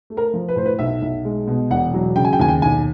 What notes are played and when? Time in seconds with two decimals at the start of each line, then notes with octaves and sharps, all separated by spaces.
0.10 A3
0.17 A#4
0.34 F3
0.48 B4
0.56 A2 C5
0.66 B4
0.79 B1 E5
1.02 B1
1.25 G#3
1.47 B2
1.70 E1 F#5
1.94 F#3
2.16 C#3 G5
2.25 G#5
2.33 G5
2.40 D#2 G#5
2.48 G5
2.62 B1 G#5